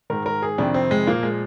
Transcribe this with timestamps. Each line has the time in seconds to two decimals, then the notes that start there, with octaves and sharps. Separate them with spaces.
0.10 G#2 D#3 A#4
0.26 A#4
0.42 G#4
0.58 F2 C3 D#3 D4
0.74 C4
0.91 G#3
1.07 A#2 F3 A#3
1.23 G#3